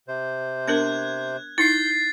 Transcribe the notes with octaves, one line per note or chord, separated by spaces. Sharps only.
C3 C5
B3 D4 A#4 F#6 G#6
D#4 E4 G6 A6 C7